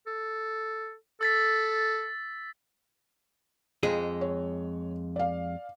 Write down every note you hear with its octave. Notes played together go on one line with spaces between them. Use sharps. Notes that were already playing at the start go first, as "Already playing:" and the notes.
A4
A4 E6 A6 B6
F2 G#3 G#4
C#5
D5 F5